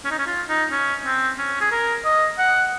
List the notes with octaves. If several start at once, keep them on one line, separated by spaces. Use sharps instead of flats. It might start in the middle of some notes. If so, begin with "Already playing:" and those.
C#4
D#4
C#4
F4
D#4
C#4
C4
C#4
G#4
A#4
D#5
F#5